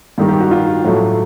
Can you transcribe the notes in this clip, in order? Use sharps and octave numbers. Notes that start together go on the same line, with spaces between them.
G2 D#3 G3 G4
G4
F#4
F4
A2 F#3 A3